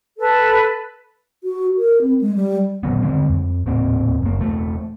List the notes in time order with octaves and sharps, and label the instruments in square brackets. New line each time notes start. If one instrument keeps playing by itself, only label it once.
[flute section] A4 B4
[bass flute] F#4
A#4
C4
G#3
G3
[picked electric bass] A#2 D#3 F#3 B3
D3 G3 G#3 C4
F2
D#1 A2 A#3 C4
F#1 A#3
E1 A3